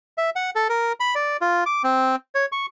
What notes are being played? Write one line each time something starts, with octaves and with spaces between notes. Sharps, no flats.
E5
F#5
A4
A#4
B5
D5
F4
D6
C4
C#5
C#6